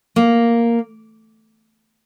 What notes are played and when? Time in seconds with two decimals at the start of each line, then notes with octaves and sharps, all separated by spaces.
0.16 A#3